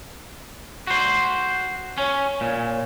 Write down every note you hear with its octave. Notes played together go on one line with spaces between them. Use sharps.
F#4 C5
C#4 C#5
A#2